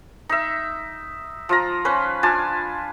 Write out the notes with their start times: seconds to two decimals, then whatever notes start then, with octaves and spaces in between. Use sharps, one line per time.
0.29 D#4 E5
1.49 F3 F4 A#5
1.85 C#4 B4 C5
2.23 D4 F4 G#5 A5